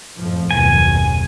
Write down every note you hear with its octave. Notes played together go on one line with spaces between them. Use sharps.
F2 A2 F3
F#1 D#2 B2 G#5